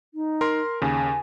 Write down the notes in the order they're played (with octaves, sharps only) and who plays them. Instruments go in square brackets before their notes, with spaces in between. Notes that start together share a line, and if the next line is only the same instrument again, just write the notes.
[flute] D#4
[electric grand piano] A#4 C6
[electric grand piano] D#2 C#3 [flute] G#5